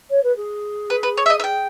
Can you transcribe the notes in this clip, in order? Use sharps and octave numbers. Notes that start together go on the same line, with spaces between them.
C#5
B4
G#4
B4
B4
C#5
E5
D#5
E5
G5